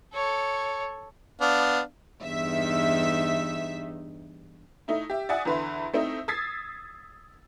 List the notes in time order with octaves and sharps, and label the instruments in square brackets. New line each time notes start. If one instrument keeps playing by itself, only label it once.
[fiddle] A4 C#5
[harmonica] B3 D4 F5
[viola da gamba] E2 G2 D#4 [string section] E5
[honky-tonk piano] A3 D#4 E4
G4 E5
D5 E5 F#5 G#5 D#6
E2 D3 B4 E5 C6
A3 C4 D#4 E4
D#6 E6 G#6 A6 B6 C7